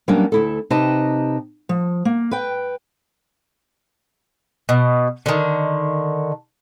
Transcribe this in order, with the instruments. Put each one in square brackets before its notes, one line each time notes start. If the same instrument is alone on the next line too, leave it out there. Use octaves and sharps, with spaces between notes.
[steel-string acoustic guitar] F#3 G3 A#3 B3 C#4 D4
D2 E4 A4
C3 D#4 G4 B4 D#5 A5
F3
A#3
B4 G5
[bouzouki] B2
D3 D#3